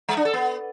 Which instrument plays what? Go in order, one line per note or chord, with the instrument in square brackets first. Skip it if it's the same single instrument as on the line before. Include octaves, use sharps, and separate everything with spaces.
[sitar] G#3
D4
A4
B3